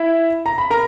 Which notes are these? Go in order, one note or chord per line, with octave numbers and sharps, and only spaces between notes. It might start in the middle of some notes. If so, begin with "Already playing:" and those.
Already playing: E4 E5
A#5
B5
A#4 A#5